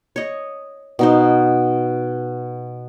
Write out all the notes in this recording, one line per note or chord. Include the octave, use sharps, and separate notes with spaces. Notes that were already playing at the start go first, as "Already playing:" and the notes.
C#5 D#5
B2 D#4 C5